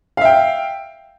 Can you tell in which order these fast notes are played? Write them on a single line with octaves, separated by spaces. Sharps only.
F5 E5 G5